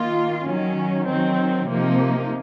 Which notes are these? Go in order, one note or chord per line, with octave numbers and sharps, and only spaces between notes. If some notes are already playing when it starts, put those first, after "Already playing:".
Already playing: D#3 A#3 F4
D#3 F#3 C#4
D#3 F#3 C4
C3 F3 A#3 D#4